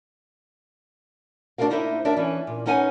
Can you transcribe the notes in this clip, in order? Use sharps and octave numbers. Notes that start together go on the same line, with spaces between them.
A3 D4 E4 F#4 A#4 F5
A#3 D#4 E4 C5 C#5 E5
D2 D4 A#4 D5 E5
E3 C#4 E4
A#2
B3 C#4 D#4 F#5 G#5